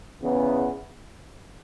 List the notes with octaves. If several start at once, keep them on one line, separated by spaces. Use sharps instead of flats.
E2 C#3 E3 B3